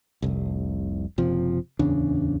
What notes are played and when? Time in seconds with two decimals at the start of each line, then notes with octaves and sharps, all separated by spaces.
0.22 F1 C2
1.18 F#1 C3 F3
1.79 D1 E2 C#3 D4